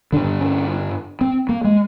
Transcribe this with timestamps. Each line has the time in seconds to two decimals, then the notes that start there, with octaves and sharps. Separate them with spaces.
0.13 G2 D3 D4
0.41 C#4
1.21 C4
1.49 A#3
1.64 G#3